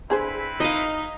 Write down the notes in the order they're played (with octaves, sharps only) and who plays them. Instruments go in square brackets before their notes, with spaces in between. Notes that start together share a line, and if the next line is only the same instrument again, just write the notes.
[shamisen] D3 G#4 C5 [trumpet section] C4 E4 B4
[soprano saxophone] D#4 [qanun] D#5 F5